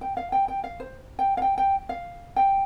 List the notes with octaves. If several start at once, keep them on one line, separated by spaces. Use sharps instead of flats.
G5
F5
G5
G5
F5
C5
G5
F5
G5
G5
F5
G5